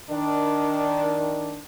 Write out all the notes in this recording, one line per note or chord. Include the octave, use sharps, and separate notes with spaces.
D#3 D4